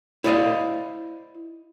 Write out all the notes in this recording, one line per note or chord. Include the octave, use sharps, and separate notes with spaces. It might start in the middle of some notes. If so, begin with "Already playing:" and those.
E4 C5 D5 D#5 F5